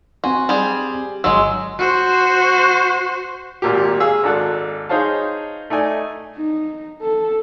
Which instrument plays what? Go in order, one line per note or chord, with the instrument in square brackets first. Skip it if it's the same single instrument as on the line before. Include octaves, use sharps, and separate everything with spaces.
[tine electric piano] C4 G#5 C6 [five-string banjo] F#4
[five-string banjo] G3 G#4
[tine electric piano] G1 C6 E6 [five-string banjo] F#3 G#3
[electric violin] F#4 C5
[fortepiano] G#1 A#2 G4
G#4 F5 E6
G#1 D4 A4 F#6
D#4 G#4 C5 C#5 F5 A5
A3 D#4 D5 G#5
[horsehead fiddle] D#4
A4